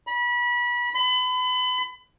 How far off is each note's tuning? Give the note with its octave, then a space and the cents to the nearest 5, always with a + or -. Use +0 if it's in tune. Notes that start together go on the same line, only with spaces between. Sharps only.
B5 -30
B5 +35